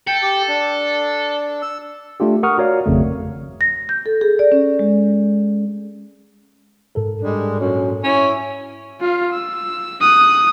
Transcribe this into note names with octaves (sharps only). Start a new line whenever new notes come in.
A4 G5
G4
D4
E6
A3 D4 F4 G4
A#4 F#5 C#6 D#6 F6
F#4 A#4 C#5 D5 F5
G#1 F2 C#3 A3
A#6
G6
A4
G#4
D5
C#4
G#3
G#2 A4 A#4
G3 G#3 D4
F#2 A#2 C#4
C#4 E4 C#5
F4 F5
E6
D#6 F#6